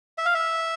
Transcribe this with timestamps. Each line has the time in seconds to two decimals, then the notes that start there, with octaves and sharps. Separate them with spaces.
0.18 E5
0.26 F5
0.34 E5